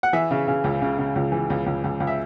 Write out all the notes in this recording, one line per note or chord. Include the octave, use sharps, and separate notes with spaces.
F#5
E3 E5
C#3
C#3
C#2
C#3
C#3
C#2
E3
C#2
C#2
C#2
C#2
E5